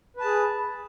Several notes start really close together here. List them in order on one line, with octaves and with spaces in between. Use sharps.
B4 A5 G#4